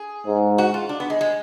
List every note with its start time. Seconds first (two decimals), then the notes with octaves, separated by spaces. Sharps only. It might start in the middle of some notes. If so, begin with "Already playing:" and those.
Already playing: G#4
0.27 G#2
0.58 F#4
0.74 F4
0.89 D4
1.00 B3
1.10 G#3
1.21 G#3